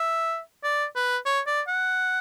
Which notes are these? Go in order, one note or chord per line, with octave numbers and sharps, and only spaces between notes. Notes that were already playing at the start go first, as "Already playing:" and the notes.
Already playing: E5
D5
B4
C#5
D5
F#5